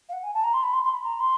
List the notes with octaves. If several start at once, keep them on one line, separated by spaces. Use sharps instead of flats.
F5
F#5
G#5
A5
A#5
C6
B5
C6
C6
B5
A#5
C6